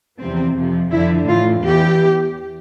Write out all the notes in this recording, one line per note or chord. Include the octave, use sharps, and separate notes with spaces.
E2 C3 F3 C4
F2 C3 F3
F2 D3 F3 E4
A2 E3 F4
E2 E3 G4